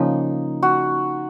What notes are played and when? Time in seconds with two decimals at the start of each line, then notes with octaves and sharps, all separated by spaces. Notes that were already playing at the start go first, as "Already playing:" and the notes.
Already playing: C#3 F3 A#3 D#4
0.63 F#4